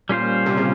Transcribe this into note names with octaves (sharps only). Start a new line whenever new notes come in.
A#2 G3 C#4 F4 C5
C3
C#3